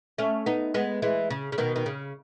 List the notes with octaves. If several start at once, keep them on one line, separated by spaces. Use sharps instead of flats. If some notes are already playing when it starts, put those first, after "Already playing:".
A3 C#4
B3 D#4
G#3 B3
E3 G#3
C#3
C#3
B2 D#3
D#3
C#3